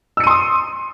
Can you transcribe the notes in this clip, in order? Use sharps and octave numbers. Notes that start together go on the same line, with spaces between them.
C6 D#6 E6 C#7 D#7